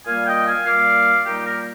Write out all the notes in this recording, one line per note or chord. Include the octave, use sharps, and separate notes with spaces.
A#2 G3 A#3 F5 G#5
D#5 G5
F5 G#5
A#2 G3 A#3 D5 F5
A#2 G3 A#3 D#4 G4
G4 A#4